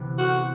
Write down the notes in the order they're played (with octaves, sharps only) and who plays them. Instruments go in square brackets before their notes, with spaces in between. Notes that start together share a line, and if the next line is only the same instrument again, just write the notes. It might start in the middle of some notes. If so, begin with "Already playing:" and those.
Already playing: [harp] C3 E3 B3
[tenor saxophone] F#4